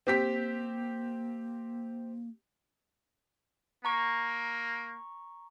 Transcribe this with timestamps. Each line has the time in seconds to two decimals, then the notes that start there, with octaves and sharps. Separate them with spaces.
0.07 A#3 C4 G4 B6
3.85 A#3 A#5 C#6